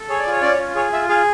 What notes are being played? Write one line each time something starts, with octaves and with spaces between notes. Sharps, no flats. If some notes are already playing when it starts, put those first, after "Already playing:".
Already playing: A4
G#4 C#5
D5
F4 C#5
C#4 D5
C#5
F4
G#4 C#5
F4 E5
G#4 F5